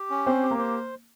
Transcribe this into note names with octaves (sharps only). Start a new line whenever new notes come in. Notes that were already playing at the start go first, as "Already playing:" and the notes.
Already playing: G4
C#4
C4 C5
G4
A#3
C5